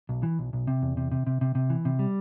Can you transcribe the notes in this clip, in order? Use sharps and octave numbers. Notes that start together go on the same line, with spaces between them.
B1
E3
B1
B1
C3
E2
C3
C3
C3
C3
C3
E3
C3
G3